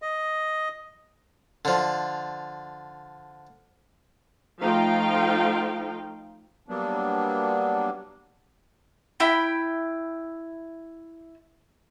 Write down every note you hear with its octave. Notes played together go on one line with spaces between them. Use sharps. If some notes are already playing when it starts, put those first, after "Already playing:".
D#5
D3 F3
F3 A3 D#4 F4 F5 G5
F#3 G3 A#3 B3 D4
E4 G5 B5